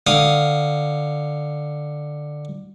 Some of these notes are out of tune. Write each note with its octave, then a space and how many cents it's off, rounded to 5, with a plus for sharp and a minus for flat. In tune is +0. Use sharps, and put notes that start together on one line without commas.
D3 +10 F5 +0 D#6 +0